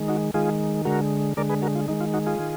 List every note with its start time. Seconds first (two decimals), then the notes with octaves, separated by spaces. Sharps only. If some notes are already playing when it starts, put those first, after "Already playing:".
Already playing: D#3 G#3
0.08 D#4 F#4
0.34 D#3 G#3 F4 G#4
0.85 D3 G#3 F#4 A#4
1.37 D3 G#3 A#4 D5
1.49 G#4 B4
1.62 F#4 A#4
1.75 F4
1.88 D#3 G#3 D#4
2.01 F4
2.14 D#4 F#4
2.26 F4 G#4
2.39 D#3